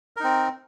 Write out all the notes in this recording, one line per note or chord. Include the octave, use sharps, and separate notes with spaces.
C4 D#4 A#4